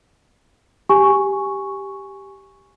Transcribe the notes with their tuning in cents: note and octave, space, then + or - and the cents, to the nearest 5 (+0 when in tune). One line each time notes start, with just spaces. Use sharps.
G4 +0 G#5 +0 C#6 +0